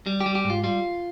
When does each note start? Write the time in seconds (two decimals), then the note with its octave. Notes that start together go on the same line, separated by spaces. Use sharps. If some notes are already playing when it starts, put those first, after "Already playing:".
0.06 G3
0.20 G4
0.26 G3
0.35 G4
0.44 G#2
0.50 F4
0.64 G3 F4